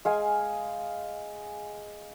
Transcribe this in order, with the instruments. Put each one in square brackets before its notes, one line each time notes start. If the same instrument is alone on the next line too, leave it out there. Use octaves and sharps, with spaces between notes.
[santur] G#3 F5 G#5